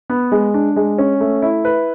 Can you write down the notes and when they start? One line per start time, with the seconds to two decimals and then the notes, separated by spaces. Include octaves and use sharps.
0.10 B3
0.32 G#3
0.54 D4
0.76 G#3
0.98 C#4
1.21 A3
1.42 E4
1.65 B4